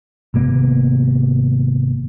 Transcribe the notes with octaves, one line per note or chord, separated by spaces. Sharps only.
G#1 C3 A#3 B3